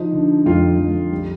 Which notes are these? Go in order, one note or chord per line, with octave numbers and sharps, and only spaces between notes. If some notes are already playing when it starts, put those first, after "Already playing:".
Already playing: F3 D#4
D3
F2 F4
F2
G3